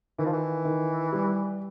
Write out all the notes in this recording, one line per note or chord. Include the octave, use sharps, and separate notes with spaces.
D#3 E3
F3
E3
D#3
G3